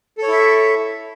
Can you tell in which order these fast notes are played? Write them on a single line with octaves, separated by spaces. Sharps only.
A4 C#5 E4 E5